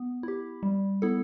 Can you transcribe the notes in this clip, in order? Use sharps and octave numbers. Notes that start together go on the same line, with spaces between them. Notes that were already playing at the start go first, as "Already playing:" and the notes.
Already playing: B3
E4 G4
G3
B3 E4 A4